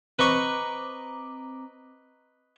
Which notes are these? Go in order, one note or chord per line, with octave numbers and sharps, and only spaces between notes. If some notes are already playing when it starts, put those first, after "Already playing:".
C4 B4 D#5 A#5 C#6 D6